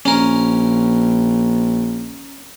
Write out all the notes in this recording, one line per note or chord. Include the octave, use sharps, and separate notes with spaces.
A#1 C#4 A#4